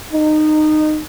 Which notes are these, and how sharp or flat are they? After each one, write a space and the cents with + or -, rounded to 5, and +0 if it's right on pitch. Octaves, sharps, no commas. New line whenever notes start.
D#4 -20